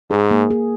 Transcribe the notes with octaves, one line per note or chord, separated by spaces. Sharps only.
G#2 G#4
A#3
G#4